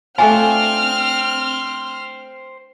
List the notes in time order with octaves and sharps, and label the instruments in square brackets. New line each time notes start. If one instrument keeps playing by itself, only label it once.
[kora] A3 D4 F4 [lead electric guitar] C5 G5 [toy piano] G#5 [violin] F6